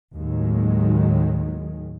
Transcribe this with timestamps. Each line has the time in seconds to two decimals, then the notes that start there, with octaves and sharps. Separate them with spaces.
0.15 D#2 A2 D#3 F#3 G#3